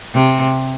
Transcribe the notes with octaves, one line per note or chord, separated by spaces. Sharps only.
C3